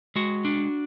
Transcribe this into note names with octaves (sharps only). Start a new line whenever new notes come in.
G#3 F#4
D4